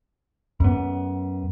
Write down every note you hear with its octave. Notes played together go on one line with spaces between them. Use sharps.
F#2 B3